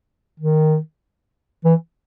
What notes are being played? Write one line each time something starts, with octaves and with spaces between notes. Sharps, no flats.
D#3
E3